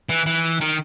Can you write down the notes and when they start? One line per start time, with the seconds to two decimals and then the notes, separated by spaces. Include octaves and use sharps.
0.09 E3
0.26 E3
0.61 D#3